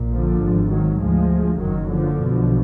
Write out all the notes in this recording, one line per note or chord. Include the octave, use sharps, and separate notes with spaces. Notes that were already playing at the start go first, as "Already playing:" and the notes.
Already playing: A#1 A#2
D3 F3
G#1 G#2
D#3 F#3
D2 F3 G#3
F#1 F#2 D#3 F#3
D3 F3
B1 B2